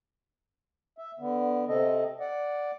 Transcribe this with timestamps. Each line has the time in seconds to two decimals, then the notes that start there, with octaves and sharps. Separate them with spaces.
0.98 E5
1.19 D3 B3
1.69 C3 C4 A4 D#5
2.20 D5 F#5